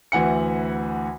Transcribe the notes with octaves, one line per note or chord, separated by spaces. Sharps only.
D2 E3 F#5 C#7